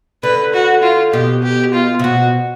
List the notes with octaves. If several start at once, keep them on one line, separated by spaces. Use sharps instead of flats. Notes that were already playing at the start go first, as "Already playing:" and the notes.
D3 B4
F#4
F4
B2 G4
G4
F4
C3
B2 F#4